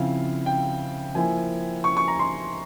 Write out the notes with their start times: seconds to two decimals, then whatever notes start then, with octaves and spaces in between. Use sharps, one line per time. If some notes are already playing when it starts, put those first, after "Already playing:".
Already playing: C#3 F3 C4 E4 F5
0.46 G5
1.15 F3 A#3 E4 G#5
1.84 C#6
1.97 C#6
2.08 A#5
2.19 C6